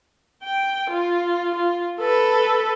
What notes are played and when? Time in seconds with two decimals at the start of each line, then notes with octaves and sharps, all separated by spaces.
0.43 G5
0.90 F4
1.54 F4
2.00 A4 B4